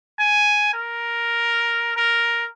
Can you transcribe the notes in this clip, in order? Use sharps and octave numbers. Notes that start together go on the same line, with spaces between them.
G#5
A#4
A#4